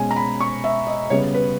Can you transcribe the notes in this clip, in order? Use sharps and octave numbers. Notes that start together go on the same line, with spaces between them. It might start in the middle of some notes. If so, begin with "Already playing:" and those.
Already playing: B2 G#3 C#4 G#5
A#5
B5
C#6
E5
D#5
C#3 G3 B3 C#5
B4